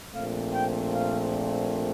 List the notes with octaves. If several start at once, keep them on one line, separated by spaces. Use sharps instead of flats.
A#1 A#2 A3 C4 F5
G5
F5